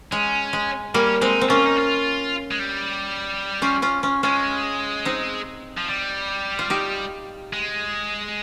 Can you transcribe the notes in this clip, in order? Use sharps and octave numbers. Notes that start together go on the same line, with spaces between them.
G#3 C#4
G#3
G3 A#3 C#4
G#3 C4 D#4
C4
A#3 C#4 F4
D#4
F4
G#3
G3
C#4 F4
C#4 F4
C#4 F4
G#3 C#4 F4
C4 D#4
F3
G3
F4
D#4 G4
G#3